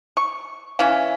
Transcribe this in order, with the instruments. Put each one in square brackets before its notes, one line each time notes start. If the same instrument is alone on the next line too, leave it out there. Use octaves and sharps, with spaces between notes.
[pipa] C#6
[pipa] E3 C#4 [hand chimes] F5